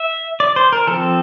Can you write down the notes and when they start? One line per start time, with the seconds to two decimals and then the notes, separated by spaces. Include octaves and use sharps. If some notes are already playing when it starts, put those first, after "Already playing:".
Already playing: E5
0.40 D5
0.56 C5
0.73 A#4
0.87 F3 C4 A4